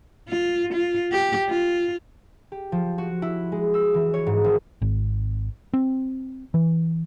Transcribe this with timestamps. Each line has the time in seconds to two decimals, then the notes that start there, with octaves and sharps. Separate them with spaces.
0.29 F4
0.73 F4
1.12 G4
1.50 F4
2.52 G4
2.72 F3
2.98 F#4
3.22 E4
3.52 G#3
3.74 E6
3.94 E3
4.14 C#5
4.26 G#2
4.44 G#1
4.82 G#1
5.74 C4
6.54 E3